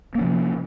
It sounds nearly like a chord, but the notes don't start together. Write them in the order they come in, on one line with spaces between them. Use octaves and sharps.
A#3 C#4 F3 C3